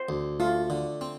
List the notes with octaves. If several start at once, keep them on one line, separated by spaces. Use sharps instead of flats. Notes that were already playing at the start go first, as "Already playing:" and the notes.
Already playing: C5
D2
A3 F4
D3
C4